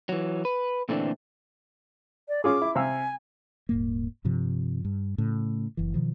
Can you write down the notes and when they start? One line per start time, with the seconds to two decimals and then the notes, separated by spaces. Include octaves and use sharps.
0.09 E3 F#3
0.45 B4
0.89 A#2 D3 E3 A3 C4 D4
2.29 D5
2.44 C#4 F4 G#4 D6
2.62 E4
2.75 C3 F5 G#5 E6
3.69 D#1 G#2 A#3
4.24 G2 C3 F3
4.85 G2
5.18 A2 C#3
5.77 F#1 E3
5.94 B2 D#3 F3